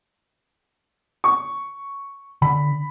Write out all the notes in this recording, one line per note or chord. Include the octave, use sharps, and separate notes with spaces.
C#6
D3 B5